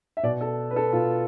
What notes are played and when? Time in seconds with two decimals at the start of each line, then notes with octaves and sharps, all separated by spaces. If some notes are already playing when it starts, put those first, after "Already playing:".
0.17 E5
0.23 B2 D5
0.41 A4
0.71 B4
0.76 A4
0.93 B2 F4